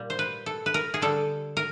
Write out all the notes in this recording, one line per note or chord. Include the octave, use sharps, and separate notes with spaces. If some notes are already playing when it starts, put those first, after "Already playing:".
Already playing: A#2 G3
C5
B4
A4
B4
A#4
G#4
D3 G3 A4
A#4